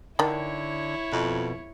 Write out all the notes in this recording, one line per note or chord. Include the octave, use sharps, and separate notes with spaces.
D3 D#3 D4 E4 C#5
F2 B2